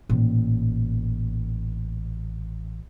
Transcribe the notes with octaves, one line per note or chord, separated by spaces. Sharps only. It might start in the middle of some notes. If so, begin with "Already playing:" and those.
A1 A#2